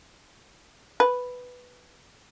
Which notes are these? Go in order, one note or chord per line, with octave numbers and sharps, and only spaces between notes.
B4